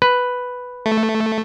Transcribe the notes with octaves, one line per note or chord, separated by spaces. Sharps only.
B4
A3